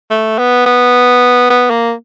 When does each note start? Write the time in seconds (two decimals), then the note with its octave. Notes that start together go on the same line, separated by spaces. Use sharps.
0.10 A3
0.38 B3
0.66 B3
1.50 B3
1.70 A#3